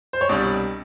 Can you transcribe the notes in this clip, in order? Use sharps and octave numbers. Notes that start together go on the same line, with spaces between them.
C5
C#5
C2 B2 G3 D4 D5